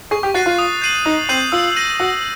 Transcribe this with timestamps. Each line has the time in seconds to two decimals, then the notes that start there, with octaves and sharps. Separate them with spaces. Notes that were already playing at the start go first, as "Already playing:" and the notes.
0.11 G#4 C#6
0.23 G4
0.34 F#4 F#6 A6 C7 D#7
0.46 F4
0.58 D#6
0.82 G6 C7 D#7 F#7
1.05 D#4 D#6
1.29 C4 G6 C7 D#7 F#7
1.52 F4 E6
1.76 G6 A#6 D#7
2.00 F#4 E6